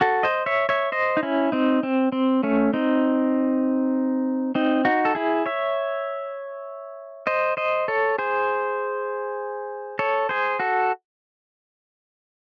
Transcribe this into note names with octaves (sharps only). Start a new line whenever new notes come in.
F#4 A4
C5 D#5
C#5 E5
C#5 E5
C5 D#5
D#4
C#4 E4
C4 D#4
C4
C4
A3 C#4
C4 D#4
C4 D#4
D#4 F#4
A4
E4 G#4
C#5 E5
C5 D#5
C5 D#5
A4 C#5
G#4 C5
A4 C#5
G#4 C5
F#4 A4